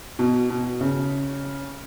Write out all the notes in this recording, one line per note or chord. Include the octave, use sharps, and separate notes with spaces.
B2
B2
C#3